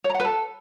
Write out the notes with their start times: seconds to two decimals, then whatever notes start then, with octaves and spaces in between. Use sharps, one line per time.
0.04 C#5
0.09 A#5
0.15 F#5
0.20 B4
0.25 A4